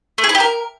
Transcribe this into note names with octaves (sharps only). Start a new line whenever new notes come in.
A3
G#4
E4
G4
A#4